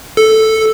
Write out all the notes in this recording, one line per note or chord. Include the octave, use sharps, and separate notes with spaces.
A4